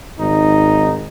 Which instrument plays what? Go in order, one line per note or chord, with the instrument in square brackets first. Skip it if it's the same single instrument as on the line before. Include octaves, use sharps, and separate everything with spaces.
[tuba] G#1 [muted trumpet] D#4